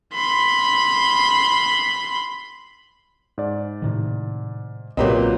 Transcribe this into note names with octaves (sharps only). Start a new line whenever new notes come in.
B5 C6
G#2 D5
A2 C3 D#3
B1 A#2 C#3 F#3 C4 G4 B4 D#5